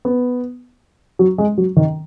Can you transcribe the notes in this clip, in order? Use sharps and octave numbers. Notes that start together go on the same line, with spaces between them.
B3
F#3
G#3
F#3
D#3